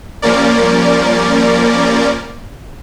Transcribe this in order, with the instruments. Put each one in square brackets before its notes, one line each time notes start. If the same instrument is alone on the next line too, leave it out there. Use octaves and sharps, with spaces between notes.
[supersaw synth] F3 G3 A#3 C#4 A#4 D5